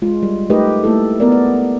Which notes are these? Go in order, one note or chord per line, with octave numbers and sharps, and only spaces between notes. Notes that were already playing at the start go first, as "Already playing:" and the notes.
G#3 F4
G3
A3 D#4 G4 A#4 B4 D#5
A3 A#3 E4 A4
B3 A#4 D5
D5